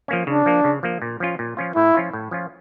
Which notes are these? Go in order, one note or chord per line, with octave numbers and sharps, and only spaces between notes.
F3 A#3 C#4
C#3 D4
F3 A#3
C#3
F3 A#3
A#2
F3 C#4 F4
A#2
F3 C#4 F4
A2 E4
F3 C#4 F4
A2
F3 C#4 F4